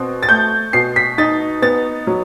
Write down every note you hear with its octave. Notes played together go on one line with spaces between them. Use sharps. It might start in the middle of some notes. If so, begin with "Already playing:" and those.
Already playing: B2 C4
A6
A3 G6
B2 C7
B6
D#4 A6
B3 A6
F#3